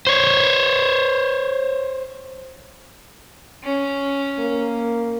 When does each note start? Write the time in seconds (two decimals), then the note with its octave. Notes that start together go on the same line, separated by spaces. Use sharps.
0.07 C5 C#5
3.63 C#4
4.39 A#3